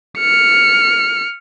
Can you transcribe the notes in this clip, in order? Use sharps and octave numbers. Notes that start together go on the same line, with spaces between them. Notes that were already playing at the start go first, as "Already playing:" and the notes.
F6 C#7